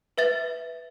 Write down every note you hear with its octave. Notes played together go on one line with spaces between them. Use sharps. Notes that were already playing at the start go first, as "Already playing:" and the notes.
B4 E5 A6